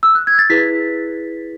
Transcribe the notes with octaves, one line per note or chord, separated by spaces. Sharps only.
E6
F#6
G#6
A6
E4 G#4 B4 B6